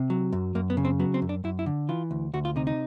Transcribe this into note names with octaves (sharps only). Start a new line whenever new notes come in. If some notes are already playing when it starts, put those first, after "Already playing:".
Already playing: C3
F#3
F#2
F#2 A#3
B3
C#3
C4
F#3 B3
C4
F#2
D4
F#2 E4
E4
D3
E3 F4
D2
D2 F#4
F4
C3 D#4
D#4